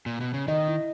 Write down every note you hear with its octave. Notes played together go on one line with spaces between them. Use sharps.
A#2
B2
C#3
D#3 D#5
E4